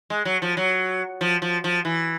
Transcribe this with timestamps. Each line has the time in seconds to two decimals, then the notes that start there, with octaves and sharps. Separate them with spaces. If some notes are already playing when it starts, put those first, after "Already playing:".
0.10 G#3
0.25 F#3
0.42 F3
0.57 F#3
1.21 F3
1.42 F3
1.64 F3
1.85 E3